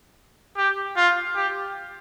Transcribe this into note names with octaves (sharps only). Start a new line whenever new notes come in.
G4
F4
G4